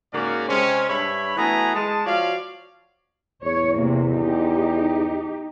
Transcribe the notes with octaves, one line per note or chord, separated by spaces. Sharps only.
G#2 C#3 A#3 C#4 F#4 D5
C3 G#3 C4 C#4
G2 D4 C#5 E5 B5
E3 A3 B3 F#4 G#5 A#5
G#3 A5
F3 F#4 C#5 D5 F5
E2 C#5
C3 A#3
D#4 G4